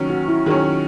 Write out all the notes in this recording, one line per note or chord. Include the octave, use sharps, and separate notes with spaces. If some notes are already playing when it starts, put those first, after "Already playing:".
Already playing: D#3 F#3 C#4
F#4
E4
D#3 F#3 C#4 G#4